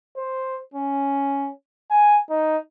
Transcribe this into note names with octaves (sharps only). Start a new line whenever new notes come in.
C5
C#4
G#5
D#4